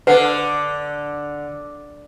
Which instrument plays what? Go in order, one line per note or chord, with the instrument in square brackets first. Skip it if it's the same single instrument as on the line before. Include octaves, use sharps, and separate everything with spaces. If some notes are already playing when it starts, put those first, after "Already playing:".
[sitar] D3 [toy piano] B4 F#5